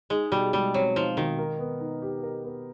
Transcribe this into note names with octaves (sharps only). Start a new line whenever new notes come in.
G#3 D#4
B2 G3
G3 G#3
F#3 C4
F3 D#4
B2 D#3
A#4
B3
D#4
G4
A#4
B3